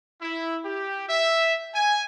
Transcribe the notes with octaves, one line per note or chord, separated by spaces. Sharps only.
E4
G4
E5
G#5